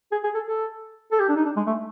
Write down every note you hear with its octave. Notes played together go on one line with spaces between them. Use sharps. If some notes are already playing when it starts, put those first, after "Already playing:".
G#4
G#4
A4
A4
A4
G4
D4
D#4
D4
G#3
A3